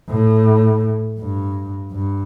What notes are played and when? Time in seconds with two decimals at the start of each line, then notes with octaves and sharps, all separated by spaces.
0.09 A2
1.19 G2
1.92 G2